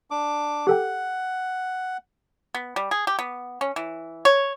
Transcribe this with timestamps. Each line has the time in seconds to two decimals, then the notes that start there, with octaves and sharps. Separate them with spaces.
0.11 D4 D6
0.67 G4 A4 F#5 G5
2.54 B3
2.76 G3
2.91 G#4
3.07 G4
3.19 B3
3.61 C#4
3.76 E3
4.25 C#5